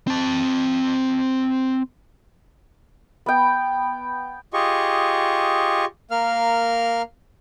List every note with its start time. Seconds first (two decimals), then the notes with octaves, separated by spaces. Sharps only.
0.07 C4 A5
3.26 B3 G5
4.54 F4 G4 G#4 D#5 C#6
6.11 A#3 A#4 F5 F6